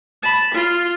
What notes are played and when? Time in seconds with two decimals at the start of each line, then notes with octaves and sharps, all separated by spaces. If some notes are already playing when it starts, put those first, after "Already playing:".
0.22 A5 B5
0.54 F4